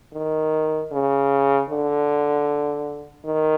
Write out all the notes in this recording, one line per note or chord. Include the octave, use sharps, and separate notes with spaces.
D#3
C#3
D3
D#3